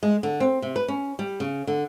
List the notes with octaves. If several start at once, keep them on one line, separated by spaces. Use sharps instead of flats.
G#3
D3
C4
C3
B4
C#4
G3
C#3
D3